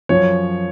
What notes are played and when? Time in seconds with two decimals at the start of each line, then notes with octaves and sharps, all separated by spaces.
0.09 F#2 F3 C#5